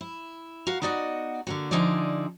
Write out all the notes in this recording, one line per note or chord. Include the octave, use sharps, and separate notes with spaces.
E4
F#4 A#4 F5
B3 D#4 F#4 D5 D#5 F#5
D3 A#3 F#4
D3 F3 D#4 E4 G#4 D5